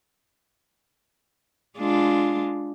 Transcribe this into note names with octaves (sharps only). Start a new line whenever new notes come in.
G#3 D4 F4